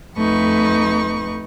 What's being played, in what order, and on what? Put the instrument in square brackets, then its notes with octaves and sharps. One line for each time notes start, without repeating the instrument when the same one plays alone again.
[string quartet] F2 A3 D#4 B4 C#6